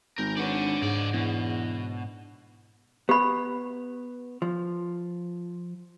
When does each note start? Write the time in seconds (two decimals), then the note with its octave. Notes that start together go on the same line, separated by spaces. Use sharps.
0.18 G#1 A#4 G6
0.37 D4 B4 C#5 D5 F#5
0.82 G#2 C#3 D5
1.13 E2 B2
3.09 B3 G4 B5
4.42 F3